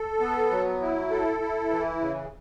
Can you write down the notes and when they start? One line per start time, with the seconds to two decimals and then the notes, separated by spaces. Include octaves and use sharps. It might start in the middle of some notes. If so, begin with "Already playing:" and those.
Already playing: A4
0.20 B3
0.51 F#3
0.81 E4
1.11 A4
1.41 E4
1.70 E3
2.00 C#3